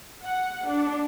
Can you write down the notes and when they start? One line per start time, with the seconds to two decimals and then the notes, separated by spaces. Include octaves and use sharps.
0.24 F#5
0.69 D4